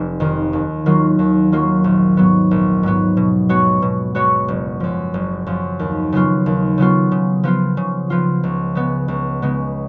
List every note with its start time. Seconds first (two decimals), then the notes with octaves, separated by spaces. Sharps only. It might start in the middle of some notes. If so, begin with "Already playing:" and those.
Already playing: F1
0.20 F2 D#3
0.53 D#2
0.86 D#3 F#3 A#3 F4
1.19 D#2
1.52 D#3 F#3 A#3 F4
1.84 A#1
2.17 G#2 F#3 B3
2.51 A#1
2.83 G#2 F#3 B3
3.17 B2
3.49 G#3 B3 F#4 C#5
3.82 B2
4.15 G#3 B3 F#4 C#5
4.48 F#1
4.80 F#2 F3
5.14 F#1
5.46 F#2 F3
5.79 D#2
6.12 C#3 F#3 B3 F4
6.46 D#2
6.78 C#3 F#3 B3 F4
7.11 C#3
7.44 F3 B3 F4
7.77 C#3
8.10 F3 B3 F4
8.43 C#2
8.75 C#3 G#3 B3
9.08 C#2
9.42 C#3 G#3 B3